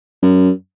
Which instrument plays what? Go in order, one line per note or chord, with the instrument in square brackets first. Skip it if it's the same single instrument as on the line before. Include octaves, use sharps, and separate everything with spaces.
[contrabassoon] F#2